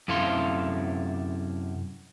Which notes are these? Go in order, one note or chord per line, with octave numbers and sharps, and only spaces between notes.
F#2 C3 E4 A4 F5 C6